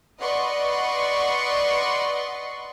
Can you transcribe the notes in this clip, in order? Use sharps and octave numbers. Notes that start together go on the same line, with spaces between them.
B4 D5 D#5 F#5 C6 C#6